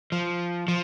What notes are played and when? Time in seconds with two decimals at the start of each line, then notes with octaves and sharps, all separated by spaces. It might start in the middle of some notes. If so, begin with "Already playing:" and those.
0.12 F3
0.68 F3